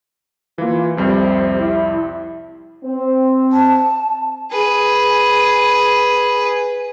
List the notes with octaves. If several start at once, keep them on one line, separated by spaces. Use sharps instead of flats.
E3 A#3 F4
C2 F2 C3 G3
E4
C4
A5
G#4 B4